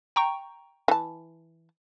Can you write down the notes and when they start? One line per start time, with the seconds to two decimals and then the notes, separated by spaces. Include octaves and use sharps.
0.16 G5 A#5 C#6
0.88 E3 A5